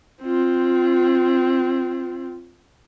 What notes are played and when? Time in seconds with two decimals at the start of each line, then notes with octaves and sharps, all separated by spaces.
0.23 C4 F4